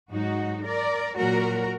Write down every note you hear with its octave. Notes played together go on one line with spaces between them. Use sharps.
G#2 F#3 D#4 F#4
A#4 D5
A#2 F#3 F#4 A#4